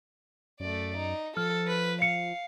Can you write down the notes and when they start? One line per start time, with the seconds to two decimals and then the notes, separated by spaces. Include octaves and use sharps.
0.60 F#2 A3 D5
0.97 D#4
1.37 F3 A4 F6
1.67 B4
2.02 F5 C#7